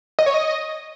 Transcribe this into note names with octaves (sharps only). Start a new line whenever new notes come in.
D#5
C#5
D#5